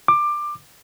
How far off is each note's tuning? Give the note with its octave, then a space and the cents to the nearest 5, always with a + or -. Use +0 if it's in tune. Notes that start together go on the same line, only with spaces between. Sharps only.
D6 +20